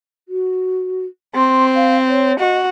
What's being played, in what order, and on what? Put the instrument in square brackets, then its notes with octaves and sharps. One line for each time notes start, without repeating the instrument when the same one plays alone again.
[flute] F#4
[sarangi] C4 [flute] C6
[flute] F5
C#5
[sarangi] F#4 [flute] D#5